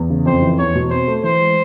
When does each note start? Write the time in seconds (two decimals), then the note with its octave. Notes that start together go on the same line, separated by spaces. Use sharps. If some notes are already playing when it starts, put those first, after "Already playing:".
Already playing: E2
0.10 C#3
0.25 F2 C5
0.42 E3
0.59 E2 C#5
0.75 B2
0.91 C4 C5
1.08 A3
1.23 E3 C5
1.41 G#3